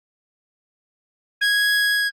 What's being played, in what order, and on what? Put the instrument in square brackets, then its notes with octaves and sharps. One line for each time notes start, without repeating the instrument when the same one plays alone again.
[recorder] G#6